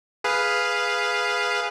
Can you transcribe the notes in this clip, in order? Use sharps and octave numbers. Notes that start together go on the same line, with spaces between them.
G#4 B4 F5